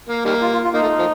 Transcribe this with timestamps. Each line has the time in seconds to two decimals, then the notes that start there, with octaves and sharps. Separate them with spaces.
0.09 A#3
0.25 D#3 G3 A#3
0.41 F4
0.53 F4
0.64 F4
0.74 A#3 D#4
0.82 A3
0.99 F3